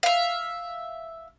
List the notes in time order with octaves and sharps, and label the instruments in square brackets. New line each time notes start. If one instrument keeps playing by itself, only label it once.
[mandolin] E5 F5